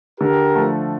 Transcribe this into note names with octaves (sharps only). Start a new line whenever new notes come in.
D3 G4 A#4
F3 A3